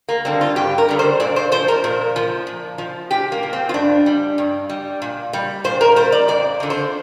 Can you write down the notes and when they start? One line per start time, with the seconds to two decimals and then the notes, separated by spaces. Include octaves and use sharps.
0.09 A#3
0.25 D3 G3 C4
0.41 F4
0.56 G2 G4
0.78 A#4
0.89 D3 G3
0.99 C5
1.20 A#2 D5
1.36 C5
1.52 F3 C5
1.68 A#4
1.84 A#2
2.16 F3
2.47 A#2
2.78 F3
3.11 A#2 G4
3.32 A#3
3.43 F3
3.53 C4
3.69 F4
3.74 G2 D4
4.06 G3
4.38 G2
4.69 G3
5.02 A#2
5.33 G3
5.64 A#2 C5
5.81 A#4
5.96 G3 C5
6.12 D5
6.28 F2 D5
6.60 D3 F3
6.70 C5